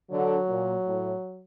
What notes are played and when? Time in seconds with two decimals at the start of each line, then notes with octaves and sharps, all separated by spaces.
0.11 D3 F#3
0.48 A#2
0.85 A2